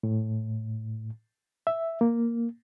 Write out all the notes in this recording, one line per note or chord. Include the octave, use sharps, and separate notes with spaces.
A2
E5
A#3